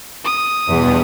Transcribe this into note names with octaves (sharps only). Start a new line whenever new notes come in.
D#6
E2 G2 B2 B3